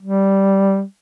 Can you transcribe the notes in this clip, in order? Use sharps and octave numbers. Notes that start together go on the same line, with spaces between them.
G3